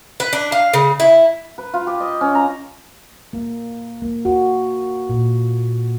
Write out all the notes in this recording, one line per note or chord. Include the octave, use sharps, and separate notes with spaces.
B4
D4
F5
C#3
E4
B4
F4
G4
D#5
C#4
A#5
A#3
A#3
F#4
A#2